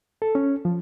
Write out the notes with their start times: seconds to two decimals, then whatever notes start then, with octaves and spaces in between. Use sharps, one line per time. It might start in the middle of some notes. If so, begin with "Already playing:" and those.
0.22 A4
0.35 C#4
0.65 F3